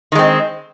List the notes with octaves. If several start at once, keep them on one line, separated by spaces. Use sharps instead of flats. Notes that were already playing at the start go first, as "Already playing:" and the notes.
D#3 G#3 C4